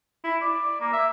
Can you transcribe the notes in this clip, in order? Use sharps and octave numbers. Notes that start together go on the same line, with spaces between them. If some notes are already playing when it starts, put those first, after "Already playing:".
E4
D5
A#3
E5